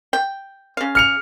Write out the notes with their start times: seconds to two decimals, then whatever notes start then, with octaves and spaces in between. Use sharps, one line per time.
0.13 G5
0.77 C#3 F5
0.95 F6 C#7 F7